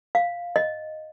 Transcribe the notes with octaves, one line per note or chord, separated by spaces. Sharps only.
F5
D#5